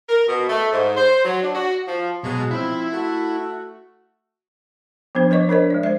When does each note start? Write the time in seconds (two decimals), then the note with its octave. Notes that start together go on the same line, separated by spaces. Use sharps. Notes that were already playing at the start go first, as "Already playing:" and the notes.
0.09 A#4
0.28 B2
0.48 A3
0.71 G#2
0.96 C5
1.25 F#3
1.43 D4
1.55 F#4
1.87 F3
2.24 B2 F#3 G#3
2.51 F3 C4 E4 B5
2.91 A3 F#4
5.15 F3 B3 D4 C5
5.30 F3 B4 C#5 D#5 C#6
5.49 D4 A#4 C5 D#5
5.70 G#3 D5
5.83 C5 E5